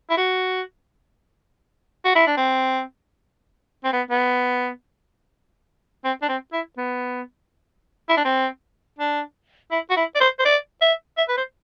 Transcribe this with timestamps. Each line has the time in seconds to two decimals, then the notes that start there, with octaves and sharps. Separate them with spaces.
0.10 E4
0.17 F#4
2.05 F#4
2.15 E4
2.27 D4
2.37 C4
3.84 C4
3.93 B3
4.10 B3
6.04 C4
6.22 D4
6.29 C4
6.53 E4
6.77 B3
8.09 E4
8.17 D4
8.24 C4
8.98 D4
9.71 E4
9.90 F#4
9.96 E4
10.15 D5
10.20 C5
10.39 C5
10.45 D5
10.81 E5
11.17 E5
11.29 B4
11.37 C5